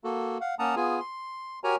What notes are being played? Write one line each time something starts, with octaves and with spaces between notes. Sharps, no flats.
A#3 F#4 A4
F5 F#5
A#3 C#4 F#5 A5 A#5 D#6
B3 F4 G#4 G#5
C6
F#4 G4 A#4 C#5 G#5 A#5